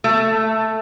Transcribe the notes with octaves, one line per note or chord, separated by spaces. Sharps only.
A3